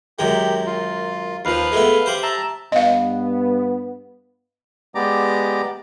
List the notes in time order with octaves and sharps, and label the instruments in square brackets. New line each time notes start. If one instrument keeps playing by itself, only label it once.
[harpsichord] F#2 D#3 G#3 [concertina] G4
[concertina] F4
[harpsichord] D#2 F3 [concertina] B4 F5
[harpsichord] G#3 A3 B3
G3 C5
[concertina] E5 A5 A#5
[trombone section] G2 B3 [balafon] D#5 F5
[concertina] G#3 B3 G4 D5 A#5 D6